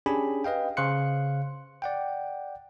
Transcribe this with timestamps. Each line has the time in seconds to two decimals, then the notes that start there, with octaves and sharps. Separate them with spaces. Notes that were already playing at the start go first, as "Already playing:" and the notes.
0.06 C#4 D4 G4 G#4 G#5 B5
0.44 B4 D#5 F5 G5
0.77 C#3 C5 F5 C6 F#6 C#7
1.82 D5 F#5 G5